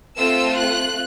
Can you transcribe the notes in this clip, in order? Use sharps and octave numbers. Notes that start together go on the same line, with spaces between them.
A3 C4 F4 A4 E6
F#6